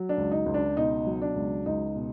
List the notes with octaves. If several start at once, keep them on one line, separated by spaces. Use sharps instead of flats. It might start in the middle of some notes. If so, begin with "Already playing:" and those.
Already playing: F#3
D4
C#2
D#4
C#2
D4
B2 D#4
F#3
D4
C#2
C#2 D#4
B2